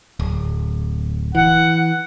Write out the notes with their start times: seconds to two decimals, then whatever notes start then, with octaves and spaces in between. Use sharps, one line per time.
0.20 D1
1.35 E3 F#5